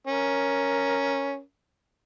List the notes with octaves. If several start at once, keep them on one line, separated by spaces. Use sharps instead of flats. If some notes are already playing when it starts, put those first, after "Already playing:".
C#4 A#4